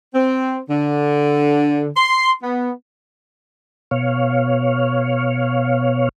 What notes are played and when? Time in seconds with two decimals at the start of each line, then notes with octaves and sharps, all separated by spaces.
0.14 C4
0.70 D3
1.96 C6
2.43 B3
3.91 B2 C#5 F5